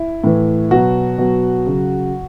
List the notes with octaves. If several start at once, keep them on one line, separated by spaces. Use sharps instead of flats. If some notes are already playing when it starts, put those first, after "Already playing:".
Already playing: E4
A2 E3
B2 F#3 F#4
B2 F#3
C#3 F#3